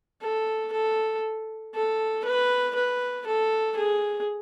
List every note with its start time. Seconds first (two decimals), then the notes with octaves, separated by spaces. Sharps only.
0.22 A4
0.73 A4
1.74 A4
2.25 B4
2.75 B4
3.26 A4
3.77 G#4